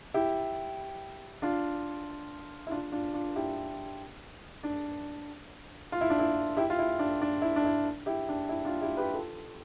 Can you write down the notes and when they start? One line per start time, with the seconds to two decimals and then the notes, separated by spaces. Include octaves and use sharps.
0.14 E4 G4
1.42 D4 F4
2.67 E4
2.71 D4 F4
2.92 D4 F4
3.14 D4 F4
3.36 E4 G4
4.63 D4
5.92 F4
6.01 E4
6.10 D4
6.19 E4
6.57 E4 G4
6.70 F4
6.79 E4
6.99 D4
7.22 D4
7.42 E4
7.56 D4
7.64 E4
8.06 E4 G4
8.29 D4
8.49 E4
8.65 D4 F4
8.81 E4 G4
8.97 G4 B4
9.13 F4 A4